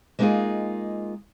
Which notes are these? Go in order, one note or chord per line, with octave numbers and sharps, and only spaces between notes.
G#3 A#3 B3 D#4 F4 G#4